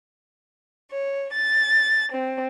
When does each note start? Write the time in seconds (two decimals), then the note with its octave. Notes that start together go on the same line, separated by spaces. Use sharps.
0.91 C#5
1.34 A6
2.11 C4